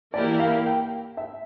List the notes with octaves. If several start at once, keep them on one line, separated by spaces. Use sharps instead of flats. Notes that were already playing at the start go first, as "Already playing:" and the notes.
E3 A#3 E4 G4 A#4 D5
F5
G5
E5